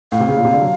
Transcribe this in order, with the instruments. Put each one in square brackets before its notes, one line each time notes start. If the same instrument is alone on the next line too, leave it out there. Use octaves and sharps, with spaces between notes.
[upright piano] A2 [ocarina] F5
[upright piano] C3
C#3
A#2
C3
D3
F#3